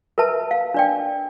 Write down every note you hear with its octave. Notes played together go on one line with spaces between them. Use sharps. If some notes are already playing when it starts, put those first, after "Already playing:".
A#4 B4 E5 A5
F5
D4 D5 G5